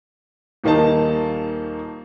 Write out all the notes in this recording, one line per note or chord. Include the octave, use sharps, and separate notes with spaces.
D#1 D#3 A#3 D#4 A5